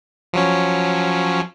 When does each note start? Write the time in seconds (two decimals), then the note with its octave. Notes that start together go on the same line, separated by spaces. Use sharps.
0.33 F3 F#3 C#4